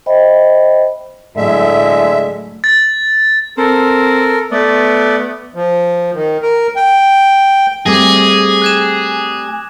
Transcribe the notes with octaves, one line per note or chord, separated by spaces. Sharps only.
C5 D#5 E5 G5 B5
A2 D3 F#3 G#3 E5
A6
C4 A4 A#4
A3 B3 D5
F3
D#3
A#4
G5
G3 A3 C4 G#4 D6 G#6 A#6
F#6 G#6 E7